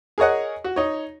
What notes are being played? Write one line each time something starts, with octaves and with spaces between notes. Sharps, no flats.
G#4 A#4 C#5 D#5 F#5
F#4
D#4 C#5